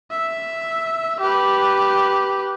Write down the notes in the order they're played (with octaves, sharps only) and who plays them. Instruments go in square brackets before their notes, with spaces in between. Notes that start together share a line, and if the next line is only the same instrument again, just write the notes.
[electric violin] E5
G4 B4